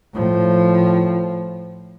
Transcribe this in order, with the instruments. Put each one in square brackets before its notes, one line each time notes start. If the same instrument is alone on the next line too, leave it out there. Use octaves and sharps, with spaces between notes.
[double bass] A2 F3